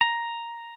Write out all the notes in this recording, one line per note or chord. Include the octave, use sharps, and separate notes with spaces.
A#5